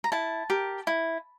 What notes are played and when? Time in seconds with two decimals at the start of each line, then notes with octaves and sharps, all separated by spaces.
0.04 A#5
0.12 E4 A5
0.50 G4 A#4
0.87 E4